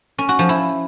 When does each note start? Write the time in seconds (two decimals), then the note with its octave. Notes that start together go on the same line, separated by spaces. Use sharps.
0.18 C#4
0.29 F#4
0.39 F3
0.49 E4